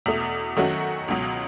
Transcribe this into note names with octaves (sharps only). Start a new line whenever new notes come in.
E2 B2 A3
D#3 F#3 A3 C#4 F#4
C#2 B2 F#3